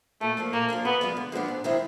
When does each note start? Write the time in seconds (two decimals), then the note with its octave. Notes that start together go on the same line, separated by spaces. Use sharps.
0.21 A#2 A3
0.37 F3 A#3 D4
0.53 A#2 A#3
0.68 F3 A#3 D4
0.85 D3 B3
1.01 F3 G#3 B3 D4
1.17 D3
1.32 F3 G#3 B3 D4
1.48 G#2
1.64 D#3 G#3 C4 E4